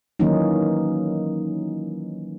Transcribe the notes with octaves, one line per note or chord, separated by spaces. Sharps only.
D#3 E3 F#3 A#3 C#4 D#4